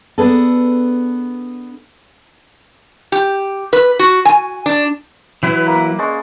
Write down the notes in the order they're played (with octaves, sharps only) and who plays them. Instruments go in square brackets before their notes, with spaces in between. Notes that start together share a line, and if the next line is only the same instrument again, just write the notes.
[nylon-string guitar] B3 D4 G#4 A4
[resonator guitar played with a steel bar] G4
B4
F#4
G#5
D4
[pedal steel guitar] E3 F#3 E4 [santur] B4
[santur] A#3 B5
G#3 C#4 D5